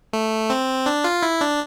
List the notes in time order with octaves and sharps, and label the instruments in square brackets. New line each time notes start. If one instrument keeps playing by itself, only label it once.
[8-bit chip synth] A3
C4
D4
F4
E4
D4